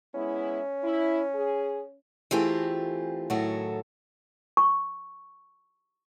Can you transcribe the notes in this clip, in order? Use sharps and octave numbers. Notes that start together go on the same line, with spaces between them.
G#3 B3 C#4 E4
E4
G#4
E3 A3 C4 F4 G4 G#4
A2 D#3 F#3 F#4 G#4 A4
C#6